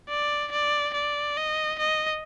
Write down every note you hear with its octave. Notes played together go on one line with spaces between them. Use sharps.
D5
D5
D5
D#5
D#5